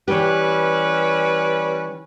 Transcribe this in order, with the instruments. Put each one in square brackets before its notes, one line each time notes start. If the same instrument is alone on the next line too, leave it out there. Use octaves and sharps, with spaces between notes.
[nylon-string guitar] E3 G4 [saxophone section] G3 C#4 B4